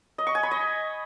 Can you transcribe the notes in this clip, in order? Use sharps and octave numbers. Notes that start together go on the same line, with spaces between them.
D#5
C#6
G#5
B5
D#5